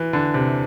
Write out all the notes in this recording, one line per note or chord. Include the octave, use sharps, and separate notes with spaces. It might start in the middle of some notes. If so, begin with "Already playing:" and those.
Already playing: E3
D3
C3